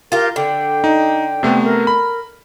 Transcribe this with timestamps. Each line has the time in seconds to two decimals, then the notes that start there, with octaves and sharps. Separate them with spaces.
0.12 F4 G4 A#4
0.36 D3 G5
0.84 D#4
1.43 C3 A3 B3
1.64 A#4
1.87 B5